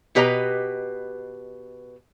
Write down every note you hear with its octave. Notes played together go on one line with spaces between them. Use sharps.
B2 G4 B4 D#5 A#5